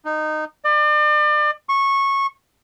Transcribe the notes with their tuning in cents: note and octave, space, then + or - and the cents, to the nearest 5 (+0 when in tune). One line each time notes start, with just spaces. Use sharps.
D#4 -15
D5 +35
C#6 -15